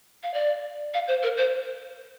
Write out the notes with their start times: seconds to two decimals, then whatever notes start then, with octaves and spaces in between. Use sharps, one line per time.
0.23 F5
0.34 D5
0.94 F5
1.08 C5
1.23 A#4
1.37 C5